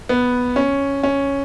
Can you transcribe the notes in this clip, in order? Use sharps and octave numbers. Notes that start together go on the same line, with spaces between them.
B3
C#4
C#4